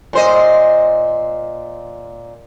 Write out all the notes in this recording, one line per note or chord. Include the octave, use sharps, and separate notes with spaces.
A#2 C5 D#5